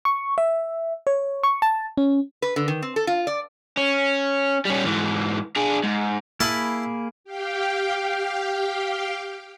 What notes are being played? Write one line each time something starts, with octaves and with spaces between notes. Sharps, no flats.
C#6
E5
C#5
C#6
A5
C#4
B4
D3
D#3
C4
A4
F4
D5
C#4
G3 C#4
G#2 E3
D4 G#4
G#2
A#3 E4 G#4 A5 B5
G4 F5 G5